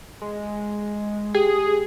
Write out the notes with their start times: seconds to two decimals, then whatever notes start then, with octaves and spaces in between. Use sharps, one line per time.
0.22 G#3
1.34 G4 G#4